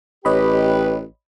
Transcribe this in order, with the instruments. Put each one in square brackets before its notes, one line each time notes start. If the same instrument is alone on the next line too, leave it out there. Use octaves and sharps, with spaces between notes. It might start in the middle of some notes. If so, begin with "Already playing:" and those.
[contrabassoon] A1 [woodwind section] G4 B4 [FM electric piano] C#5 D#5 B5